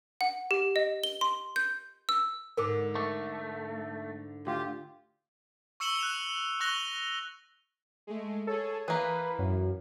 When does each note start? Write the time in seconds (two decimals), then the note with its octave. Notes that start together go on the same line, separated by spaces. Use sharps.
0.21 F#5
0.51 G4
0.76 D#5
1.04 G7
1.21 C6
1.56 G6
2.09 E6
2.57 G#2 D3 A#4 D6
2.95 A3 D#5 C#6 D6
4.47 D2 F4 G4
5.80 C#6 E6 C#7 E7 F#7 G7
5.99 F#6 E7 F7
6.60 C#6 F#6 A#6 F7 G7
8.07 G#3 A3
8.47 G#4 A4 C#5
8.88 E3 A#3 G#4 B4
9.39 F#2